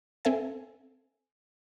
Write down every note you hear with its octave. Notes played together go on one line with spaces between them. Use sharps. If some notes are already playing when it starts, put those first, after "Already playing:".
C4 A4 E5 G#5